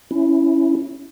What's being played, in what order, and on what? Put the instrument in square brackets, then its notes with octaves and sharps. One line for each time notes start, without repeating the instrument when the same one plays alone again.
[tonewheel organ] C#4 E4